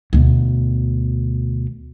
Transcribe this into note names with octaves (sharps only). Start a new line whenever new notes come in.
D2 B2